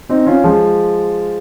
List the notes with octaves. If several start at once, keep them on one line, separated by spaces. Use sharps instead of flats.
C4 D#4
C#4 F4
F3 G#3